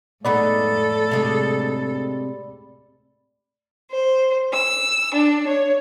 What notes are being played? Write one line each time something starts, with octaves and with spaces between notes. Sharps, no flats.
A2 G#3 B3 D#4 A4 D5 B5
C3 G#3 D4
C5
E6
D4
C#5